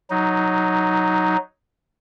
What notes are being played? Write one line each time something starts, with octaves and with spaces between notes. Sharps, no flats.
F#3 D#4